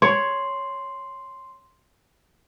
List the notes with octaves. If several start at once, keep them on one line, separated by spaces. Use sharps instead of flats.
C#5 C6